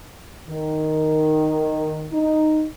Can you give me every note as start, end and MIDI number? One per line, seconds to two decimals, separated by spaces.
0.49 2.07 51
2.12 2.65 63